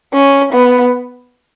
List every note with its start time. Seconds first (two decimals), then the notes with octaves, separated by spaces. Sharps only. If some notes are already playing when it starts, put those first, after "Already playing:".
0.13 C#4
0.53 B3